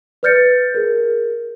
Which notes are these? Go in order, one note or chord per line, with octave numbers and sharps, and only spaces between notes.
B4 D5 F6 G6 A6 C#7
G#4 A#4